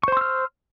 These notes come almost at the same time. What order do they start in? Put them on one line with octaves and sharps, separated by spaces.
C#6 C5 C6 E6 F6